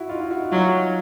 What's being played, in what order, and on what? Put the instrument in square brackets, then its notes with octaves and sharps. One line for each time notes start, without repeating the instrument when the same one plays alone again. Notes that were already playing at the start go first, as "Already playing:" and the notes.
Already playing: [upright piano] E4 F#4
D#4 F4
E4 F#4
[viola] F#3 [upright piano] D#4 F4